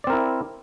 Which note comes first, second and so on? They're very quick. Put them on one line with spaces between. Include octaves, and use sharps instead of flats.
D5 C4 A#4 E4